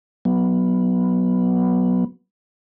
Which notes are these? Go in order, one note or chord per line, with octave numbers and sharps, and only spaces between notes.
F#3 B3